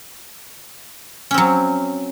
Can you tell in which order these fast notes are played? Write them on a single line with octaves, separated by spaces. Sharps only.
C#4 C4 F#3